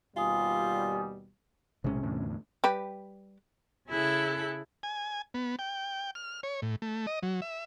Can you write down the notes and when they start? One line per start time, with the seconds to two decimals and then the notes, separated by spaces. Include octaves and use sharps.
0.17 D#2 B2 G3 F4 G#5 D#6
1.84 B1 A2 C3 G#3 C#4
2.03 E2 A2 D3
2.64 G3 G4 B4
3.88 C#3 E4 G#4 A4 F#6
4.83 G#5
5.34 B3
5.59 G5
6.15 F6
6.43 C#5
6.62 A2
6.82 A3
7.07 D#5
7.23 F#3
7.42 E5